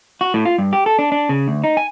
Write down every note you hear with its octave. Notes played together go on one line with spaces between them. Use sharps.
F#4
A2
F4
G2
G4
A4
D4
D4
C#3
D2
D#4
G#5